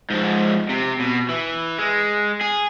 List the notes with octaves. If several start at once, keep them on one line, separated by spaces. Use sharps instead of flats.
G#2 F3
C3
B2
E3
G#3
G#4